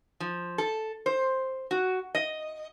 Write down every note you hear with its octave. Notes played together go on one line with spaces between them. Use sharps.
F3
A4
C5
F#4
D#5